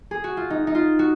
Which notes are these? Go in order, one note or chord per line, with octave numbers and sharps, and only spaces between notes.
G#4
F#4
F4
D#4
D#4
F4
F#4